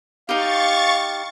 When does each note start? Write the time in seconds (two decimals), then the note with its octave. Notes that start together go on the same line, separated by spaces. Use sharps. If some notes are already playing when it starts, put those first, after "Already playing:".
0.29 D#4 G4 F5 C#6 A6